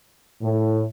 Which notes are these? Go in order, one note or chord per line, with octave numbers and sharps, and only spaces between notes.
A2